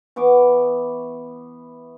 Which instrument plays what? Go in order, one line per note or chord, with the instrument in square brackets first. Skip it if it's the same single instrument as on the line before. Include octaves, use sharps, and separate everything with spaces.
[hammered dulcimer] E3 B3 C#6 D6